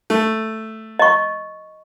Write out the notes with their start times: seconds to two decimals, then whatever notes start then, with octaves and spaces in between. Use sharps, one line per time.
0.10 A3
0.99 D#5 C#6